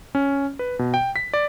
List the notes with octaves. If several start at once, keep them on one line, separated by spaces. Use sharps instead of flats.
C#4
B4
B2
G5
B6
D5